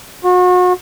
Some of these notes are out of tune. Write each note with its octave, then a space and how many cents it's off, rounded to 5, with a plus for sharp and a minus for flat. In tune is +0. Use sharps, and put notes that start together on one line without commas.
F#4 -35